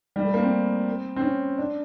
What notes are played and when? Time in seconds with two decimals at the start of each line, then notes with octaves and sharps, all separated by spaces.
0.16 G3
0.25 A3
0.34 A#3
0.43 C4
1.16 C4
1.22 C#4
1.58 D4